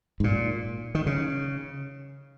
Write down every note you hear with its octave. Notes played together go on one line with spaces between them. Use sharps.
G#2
A#2
D#3
C#3